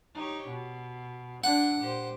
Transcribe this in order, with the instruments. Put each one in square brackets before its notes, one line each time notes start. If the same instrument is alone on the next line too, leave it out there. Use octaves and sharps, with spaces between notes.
[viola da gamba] D#4 G4 C#5
B2
[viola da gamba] D3 D4 [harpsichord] F#5
[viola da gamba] A#2 G4 C5